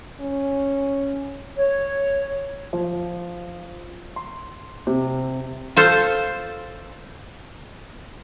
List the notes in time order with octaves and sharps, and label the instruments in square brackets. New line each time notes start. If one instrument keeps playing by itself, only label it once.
[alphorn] C#4
[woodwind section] C#5
[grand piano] F3
C6
C3
[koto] F4 A4 C5